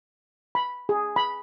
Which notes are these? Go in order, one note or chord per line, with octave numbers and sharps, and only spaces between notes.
B5
G#4
B5